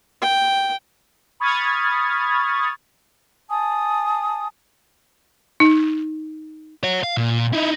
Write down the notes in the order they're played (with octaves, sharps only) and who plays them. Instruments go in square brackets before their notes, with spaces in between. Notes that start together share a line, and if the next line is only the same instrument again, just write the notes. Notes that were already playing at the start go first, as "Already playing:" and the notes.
[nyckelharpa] G5
[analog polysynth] B5 C#6 D#6 F6 G#6 A6
[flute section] G#5 A5 D#6
[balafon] D#4
[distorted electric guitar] C#5 F#5
F5
A#2
D#4 E4